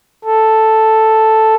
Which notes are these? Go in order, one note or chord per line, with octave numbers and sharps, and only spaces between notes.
A4